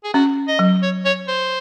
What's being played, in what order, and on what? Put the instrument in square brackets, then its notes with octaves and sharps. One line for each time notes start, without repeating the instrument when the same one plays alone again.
[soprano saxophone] G#4
[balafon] C#4 [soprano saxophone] F#4
[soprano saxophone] D#5
[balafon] F#3
[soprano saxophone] C#5
C#5
C5